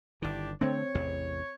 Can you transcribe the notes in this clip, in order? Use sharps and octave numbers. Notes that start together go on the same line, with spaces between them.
G1 D#3 D4 E4 G4
D3 A3 C4 D4 C#5
A1 E2 C3